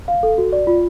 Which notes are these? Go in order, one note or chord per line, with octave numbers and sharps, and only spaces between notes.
F5
A4
F#4
D5
F4